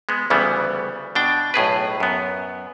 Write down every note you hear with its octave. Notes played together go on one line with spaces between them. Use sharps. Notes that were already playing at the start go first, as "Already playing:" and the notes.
G#3 B3
D2 C#3 E3 G3 B3
B2 D4 G5
B1 A2 G#4 B4
F#2 B3